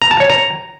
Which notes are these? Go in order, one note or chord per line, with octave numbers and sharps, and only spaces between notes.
A#5
A5
C#5
A#5